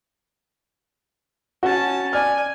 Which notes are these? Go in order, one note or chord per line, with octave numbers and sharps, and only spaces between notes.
C#4 F#4 A5
D5 G#5 F6